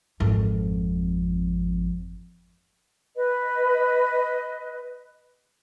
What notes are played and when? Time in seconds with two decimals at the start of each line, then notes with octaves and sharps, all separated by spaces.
0.20 G#1 F2
3.15 B4 D#5